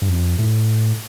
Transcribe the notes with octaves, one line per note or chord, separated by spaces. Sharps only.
G2
F2
A2